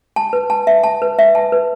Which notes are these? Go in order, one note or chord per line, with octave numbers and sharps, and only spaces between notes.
A5
B4
A5
E5
A5
B4
E5
A5
B4